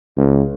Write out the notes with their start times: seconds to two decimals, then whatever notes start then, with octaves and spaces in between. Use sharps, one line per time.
0.18 C#2